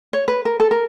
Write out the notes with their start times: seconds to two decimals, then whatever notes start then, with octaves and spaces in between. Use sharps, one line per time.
0.13 C#5
0.28 B4
0.45 A#4
0.60 A4
0.71 A#4